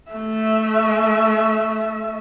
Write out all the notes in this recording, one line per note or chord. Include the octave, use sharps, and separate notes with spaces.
A3 E5